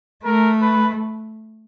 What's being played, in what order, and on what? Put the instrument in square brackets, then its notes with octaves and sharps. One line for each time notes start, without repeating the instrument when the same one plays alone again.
[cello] A3 [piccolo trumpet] A#4
[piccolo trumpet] B4